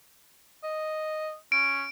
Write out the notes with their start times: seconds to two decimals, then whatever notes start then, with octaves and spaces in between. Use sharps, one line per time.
0.63 D#5
1.52 C#4 D7